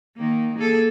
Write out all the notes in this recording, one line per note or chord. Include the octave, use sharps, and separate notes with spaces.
D#3 A#3
A#3 G#4 A4